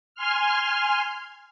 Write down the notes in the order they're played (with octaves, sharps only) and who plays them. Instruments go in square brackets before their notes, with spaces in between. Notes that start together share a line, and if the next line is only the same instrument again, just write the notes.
[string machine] G#5 C6 F6